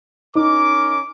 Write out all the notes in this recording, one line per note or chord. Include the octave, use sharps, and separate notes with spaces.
C#4 D#4 A#4 D6